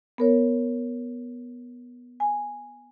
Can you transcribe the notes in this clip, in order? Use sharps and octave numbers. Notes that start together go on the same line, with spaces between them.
B3 A#4 C#5
G#5